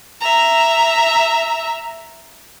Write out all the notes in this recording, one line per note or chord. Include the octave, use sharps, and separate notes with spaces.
E5 A#5